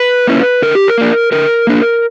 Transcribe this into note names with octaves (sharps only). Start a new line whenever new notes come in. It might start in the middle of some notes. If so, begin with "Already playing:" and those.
Already playing: B4
A#3 C#4 E4
D3 A#4
G4
A#4
A#3 D4
D3 A#4
A#3 D4